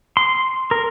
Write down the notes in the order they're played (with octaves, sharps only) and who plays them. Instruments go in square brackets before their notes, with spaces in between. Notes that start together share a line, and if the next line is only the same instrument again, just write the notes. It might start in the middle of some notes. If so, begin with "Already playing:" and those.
[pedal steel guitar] C6
A#4